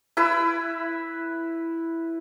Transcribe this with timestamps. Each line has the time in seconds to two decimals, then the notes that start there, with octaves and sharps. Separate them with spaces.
0.17 E4 B4 B5 E6